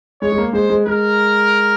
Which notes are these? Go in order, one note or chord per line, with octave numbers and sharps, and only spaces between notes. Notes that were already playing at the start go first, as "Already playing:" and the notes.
G#3 C#5
G#3
A#3
G#3 C5
G#3
G#3 A#4